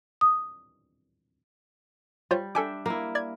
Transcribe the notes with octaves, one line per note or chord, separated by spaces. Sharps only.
D#6
G3 F4 C5 C#5
D4 A4 E5 G5 G#5 D6
A#3 E4
D5 G#6